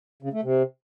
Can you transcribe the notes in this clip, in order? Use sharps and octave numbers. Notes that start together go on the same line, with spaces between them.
C#3
A3
C3